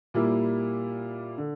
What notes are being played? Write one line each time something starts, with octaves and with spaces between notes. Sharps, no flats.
A#2 G3 A#3 E4
D3